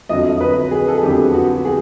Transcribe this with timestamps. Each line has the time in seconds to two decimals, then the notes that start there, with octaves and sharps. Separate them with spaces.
0.09 F2 D3 F#3 D#5
0.41 B4
0.71 G#4
0.88 A4
0.95 G#4
1.02 F2 D3 F#3 G4
1.34 F#4
1.65 G#4